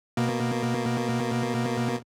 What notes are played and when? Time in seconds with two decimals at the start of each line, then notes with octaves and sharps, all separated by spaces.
0.17 B2 A#3